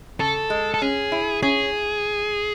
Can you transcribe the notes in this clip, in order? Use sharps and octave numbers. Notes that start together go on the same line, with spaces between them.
C#3 A4
G#3
A4
C#4 G#4
E4
C#4 G#4